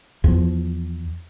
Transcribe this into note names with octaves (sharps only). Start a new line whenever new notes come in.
E2 F3